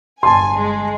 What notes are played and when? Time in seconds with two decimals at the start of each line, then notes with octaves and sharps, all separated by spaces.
0.23 G1 G#5 A5 C6
0.56 G#3